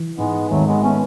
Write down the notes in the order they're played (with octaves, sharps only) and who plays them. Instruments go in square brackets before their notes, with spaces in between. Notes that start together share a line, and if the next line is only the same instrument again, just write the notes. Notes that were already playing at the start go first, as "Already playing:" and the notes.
Already playing: [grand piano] E3
[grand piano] G#2 [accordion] G#3 B3
[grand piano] G#1 [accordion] F#3 A3
[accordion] G#3 B3
[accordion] A3 C#4 [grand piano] B3